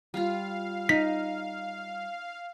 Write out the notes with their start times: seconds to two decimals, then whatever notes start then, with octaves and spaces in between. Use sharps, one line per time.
0.14 G3 F4 F5
0.89 D#4 B6